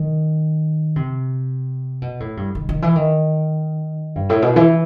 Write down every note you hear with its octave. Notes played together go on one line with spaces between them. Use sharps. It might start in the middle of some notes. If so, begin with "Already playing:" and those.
Already playing: D#3
C3
B2
A2
G2
D#3
D#3
E3
D#3
G2
A2
B2
E3